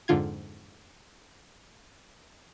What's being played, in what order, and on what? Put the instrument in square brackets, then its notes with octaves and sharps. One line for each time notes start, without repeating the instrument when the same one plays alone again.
[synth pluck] F2 G#2 D3 F4 G#6